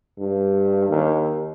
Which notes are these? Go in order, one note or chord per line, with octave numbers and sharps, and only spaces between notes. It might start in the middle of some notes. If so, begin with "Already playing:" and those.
G2
D#2